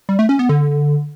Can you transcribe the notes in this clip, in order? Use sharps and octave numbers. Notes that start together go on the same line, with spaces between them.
G3
A3
C#4
B3
D3